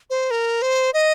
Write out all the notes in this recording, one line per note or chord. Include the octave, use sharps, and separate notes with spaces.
C5
A#4
C5
D#5